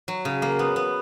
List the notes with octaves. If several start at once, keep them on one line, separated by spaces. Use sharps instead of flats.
F#3
C#3
A#3
B3
B3